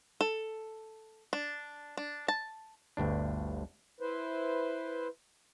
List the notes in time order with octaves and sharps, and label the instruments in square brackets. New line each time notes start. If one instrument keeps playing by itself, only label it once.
[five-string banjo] A4
D4
D4
A5
[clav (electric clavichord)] G1 D2 G2 D4
[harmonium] E4 B4 C5